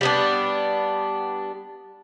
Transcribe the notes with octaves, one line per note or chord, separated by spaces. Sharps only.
G3 B3 D4